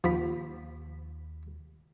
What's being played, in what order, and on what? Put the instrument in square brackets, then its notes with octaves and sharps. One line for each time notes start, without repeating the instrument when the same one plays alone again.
[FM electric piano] D#2 [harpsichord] F3 B5